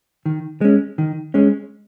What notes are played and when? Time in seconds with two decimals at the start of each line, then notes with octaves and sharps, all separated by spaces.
0.26 D#3
0.61 G#3 C#4
0.98 D#3
1.34 G#3 C#4